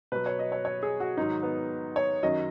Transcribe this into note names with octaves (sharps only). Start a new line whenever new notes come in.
B2 F#3 B4
C#5
D#5
C#5
C#5
G#4
F#4
G#2 D#3 F#3 D#4
B3
C#5
F#2 D#3 F#3 D#5